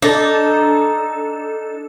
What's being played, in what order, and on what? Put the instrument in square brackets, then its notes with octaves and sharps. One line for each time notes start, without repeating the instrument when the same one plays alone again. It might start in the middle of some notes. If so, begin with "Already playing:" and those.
[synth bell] D4 A4 [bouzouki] D#4